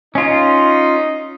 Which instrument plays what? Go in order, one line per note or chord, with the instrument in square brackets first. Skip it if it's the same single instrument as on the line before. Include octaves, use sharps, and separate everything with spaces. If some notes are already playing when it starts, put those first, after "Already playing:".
[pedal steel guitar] C#4 F4 [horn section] D#4